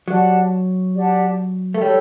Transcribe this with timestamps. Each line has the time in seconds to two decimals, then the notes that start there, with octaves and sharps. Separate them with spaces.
0.08 F#3 G4 D5 F#5 A5
0.95 G4 D5 F#5 A5
1.74 A3
1.81 G3 A4 C#5 G5